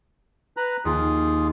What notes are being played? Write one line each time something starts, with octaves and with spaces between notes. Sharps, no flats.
B4 A#5 F#6
D#2 F4 G#4